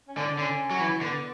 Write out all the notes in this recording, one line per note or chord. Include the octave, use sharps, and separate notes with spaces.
C#4
D3 D4
D3 C#4
F#3
E3
D3 B3